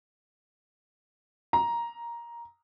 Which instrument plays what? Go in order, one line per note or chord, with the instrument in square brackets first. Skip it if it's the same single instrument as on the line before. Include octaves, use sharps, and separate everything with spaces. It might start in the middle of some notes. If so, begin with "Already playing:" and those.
[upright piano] A#5